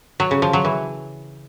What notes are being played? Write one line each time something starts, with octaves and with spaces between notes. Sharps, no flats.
F#3
C#3
F3
F#3
E3